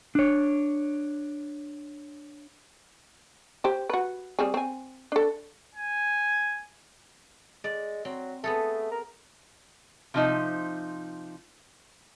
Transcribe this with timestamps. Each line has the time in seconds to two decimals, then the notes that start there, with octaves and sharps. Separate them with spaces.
0.15 D4 C#5
3.64 G4 C5
3.89 F#4 B4
4.39 G3 C4 G#4
4.54 C4 G#5
5.12 D4 A4
5.75 G#5
7.64 G#3 D5
8.05 F#3 C4
8.44 A3 B3 G#4 A4
8.91 A#4
10.14 C3 F3 D#4